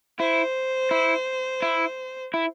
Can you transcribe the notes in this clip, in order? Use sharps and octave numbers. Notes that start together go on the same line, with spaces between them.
E4 C5
E4
E4
E4